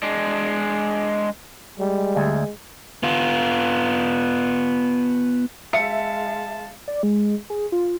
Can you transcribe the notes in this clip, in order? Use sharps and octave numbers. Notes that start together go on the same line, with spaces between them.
G#3 D4
G3 G#3
D2
B3 F4
G#3 E5 F5 A5 C#7
D5
G#3
G#4
F4